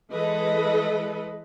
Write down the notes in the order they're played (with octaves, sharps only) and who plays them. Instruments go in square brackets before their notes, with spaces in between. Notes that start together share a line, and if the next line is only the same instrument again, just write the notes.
[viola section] E3 G#3 A4 B4 D#5